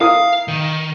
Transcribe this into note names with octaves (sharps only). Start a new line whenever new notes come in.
E4 A#4 F5 D#6
D#3